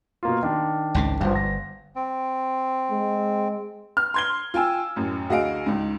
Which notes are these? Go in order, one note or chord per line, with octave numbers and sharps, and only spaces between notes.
B2 A#3 F4
D#3 D4
G#1 C#2 C#3
G1 G2 F3
A#6
C4
G#3
F6
C6 G#6 G7
F4 G5 G#5 E6
A1 F#2
D2 F#4 G#4 D#5 F5 D7
C#2 G#2